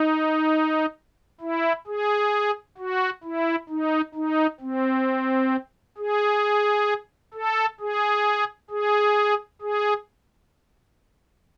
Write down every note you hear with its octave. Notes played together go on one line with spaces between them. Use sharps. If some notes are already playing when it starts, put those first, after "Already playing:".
Already playing: D#4
E4
G#4
F#4
E4
D#4
D#4
C4
G#4
A4
G#4
G#4
G#4